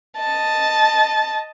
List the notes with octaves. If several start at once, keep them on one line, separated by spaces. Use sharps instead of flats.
D#5 A5